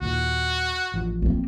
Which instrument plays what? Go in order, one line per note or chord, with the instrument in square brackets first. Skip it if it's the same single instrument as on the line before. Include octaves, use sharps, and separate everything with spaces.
[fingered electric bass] D#2 A#2 [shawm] F#4
[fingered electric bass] A1 F3
[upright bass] A#3 C4